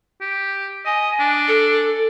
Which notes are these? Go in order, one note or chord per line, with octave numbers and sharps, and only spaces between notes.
G4
D#5 G#5
D4
A4